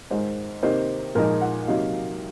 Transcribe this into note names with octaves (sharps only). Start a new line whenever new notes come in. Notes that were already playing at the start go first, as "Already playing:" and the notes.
G#2 D#3 G#3 C5
C3 D#3 A#3 D#4 C5
A#2 F3 G#3 D#4 A#4
F#5
C3 D#3 F#3 A#3 D#4 F5